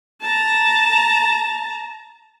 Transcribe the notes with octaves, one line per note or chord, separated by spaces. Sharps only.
A5 A#5